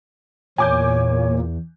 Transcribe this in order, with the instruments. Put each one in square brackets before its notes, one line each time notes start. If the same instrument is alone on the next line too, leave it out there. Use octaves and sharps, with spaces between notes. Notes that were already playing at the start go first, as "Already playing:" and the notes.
[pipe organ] E2 [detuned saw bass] A#2 [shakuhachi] C#5 [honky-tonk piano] G#5 D6 G6